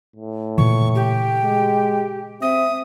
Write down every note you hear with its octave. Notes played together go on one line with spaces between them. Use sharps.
A2
A#2 C#3 E3 C#6
G4 G5
G#3
C4 E5 D#6